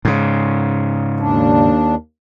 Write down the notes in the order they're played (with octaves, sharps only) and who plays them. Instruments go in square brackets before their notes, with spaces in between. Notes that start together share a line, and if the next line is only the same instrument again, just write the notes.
[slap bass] G#2 C#3
[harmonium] D#2 D4